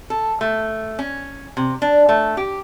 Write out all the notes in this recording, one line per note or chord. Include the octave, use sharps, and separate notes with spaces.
A4
A3
C#4
C3
D4
A3
G4